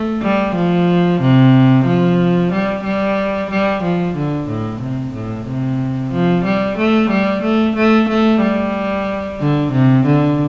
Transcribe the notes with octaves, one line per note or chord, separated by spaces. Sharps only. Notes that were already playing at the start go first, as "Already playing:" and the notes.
Already playing: A3
G3
F3
C3
F3
G3
G3
G3
F3
D3
A2
C3
A2
C3
F3
G3
A3
G3
A3
A3
A3
G3
D3
C3
D3